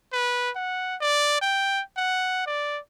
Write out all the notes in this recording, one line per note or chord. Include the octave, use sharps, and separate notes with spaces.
B4
F#5
D5
G5
F#5
D5